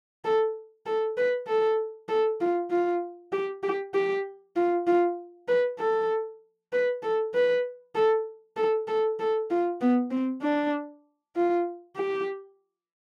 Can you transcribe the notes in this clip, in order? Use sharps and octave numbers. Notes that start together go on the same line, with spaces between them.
A4
A4
B4
A4
A4
F4
F4
G4
G4
G4
F4
F4
B4
A4
B4
A4
B4
A4
A4
A4
A4
F4
B3
C4
D4
F4
G4